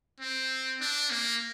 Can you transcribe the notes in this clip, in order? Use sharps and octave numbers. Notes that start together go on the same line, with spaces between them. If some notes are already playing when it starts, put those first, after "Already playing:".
C4
D4
A#3